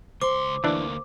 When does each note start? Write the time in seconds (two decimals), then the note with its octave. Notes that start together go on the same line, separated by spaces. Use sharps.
0.21 C#2 C5 C6 D6
0.64 D2 E3 A#3 D4